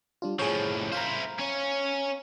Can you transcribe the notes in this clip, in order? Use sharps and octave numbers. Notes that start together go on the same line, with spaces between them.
G3 D4 F4
A2 F3 G#4 C#5
E4 C5 F5 A#5
C#4 C#5